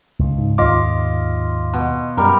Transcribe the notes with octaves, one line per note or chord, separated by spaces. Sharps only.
C#2
G#2
D#2 F4 D#5 D6
B2
F#2 G3 A#4